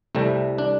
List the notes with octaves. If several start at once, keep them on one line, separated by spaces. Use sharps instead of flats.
C2 C3 G3 A3
D4